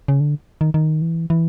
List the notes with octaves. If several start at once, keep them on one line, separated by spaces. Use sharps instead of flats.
C#3
D3
D#3
D#3
E3
E3